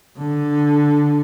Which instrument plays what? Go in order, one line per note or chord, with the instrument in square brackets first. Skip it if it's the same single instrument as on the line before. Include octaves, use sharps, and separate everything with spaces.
[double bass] D3